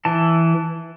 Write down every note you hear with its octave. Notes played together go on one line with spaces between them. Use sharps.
E3 A5